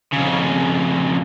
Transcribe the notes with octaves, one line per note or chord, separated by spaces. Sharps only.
F2 C#3